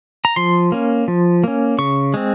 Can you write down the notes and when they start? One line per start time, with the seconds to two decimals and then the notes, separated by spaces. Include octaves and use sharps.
0.25 A#5
0.36 F3 C6
0.72 A#3 C#4
1.08 F3
1.44 A#3 C#4
1.78 C#3 C#6
2.14 G#3 C4